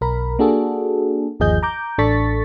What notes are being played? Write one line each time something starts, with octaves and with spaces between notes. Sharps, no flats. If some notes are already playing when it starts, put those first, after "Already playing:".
B1 A#4 B5
A#3 D4 F#4 G#4 A4
G1 D#2 F3 G#4 D#5 G6
A#5 D6 G6
A1 D4 A4 C#6 A6 B6